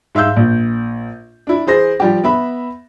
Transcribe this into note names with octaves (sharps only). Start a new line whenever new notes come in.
G#2 E5 F5 E6 G6
A#1
D4 E4
E3 G#4 C5 A#6
F3 G3 G4
B3 E5 B5